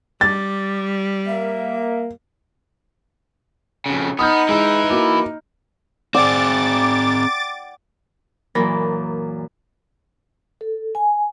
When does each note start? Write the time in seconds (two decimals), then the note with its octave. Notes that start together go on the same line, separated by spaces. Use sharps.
0.21 G3 D6 A6
1.26 A#3 E5
3.86 F2 C#3
4.19 B3 D#4 D#6 F6 G6
4.49 E3 G#3 E4
4.90 A#3 F#4 D6
6.14 C4 G#4 D5 F#5 G5 D6 A6
8.55 F#2 A#2 E3 A#4 B5
10.61 A4
10.95 G#5